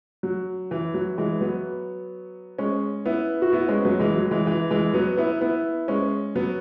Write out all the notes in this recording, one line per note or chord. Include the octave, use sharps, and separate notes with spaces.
F#3
E3
F#3
E3 G#3
F#3 B3
G#3 C#4
B3 E4
F#4
B3 E4
G#3 C#4
F#3 B3
E3 G#3
F#3
E3 G#3
E3
E3 G#3
F#3 B3
B3 E4
B3 E4
G#3 C#4
F#3 B3